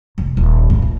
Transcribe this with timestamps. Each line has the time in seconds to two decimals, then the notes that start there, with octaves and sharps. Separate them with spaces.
0.18 F1
0.37 D#1
0.70 A2
0.82 A#2